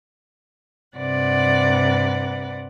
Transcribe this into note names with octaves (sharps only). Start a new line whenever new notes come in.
G2 C3 B4 D5 F#5